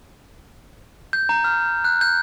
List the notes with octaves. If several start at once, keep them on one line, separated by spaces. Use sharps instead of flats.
G6
A#5
F6
F#6
G6